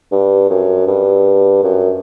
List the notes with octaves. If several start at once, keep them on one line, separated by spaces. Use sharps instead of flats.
G2
F#2
G2
F#2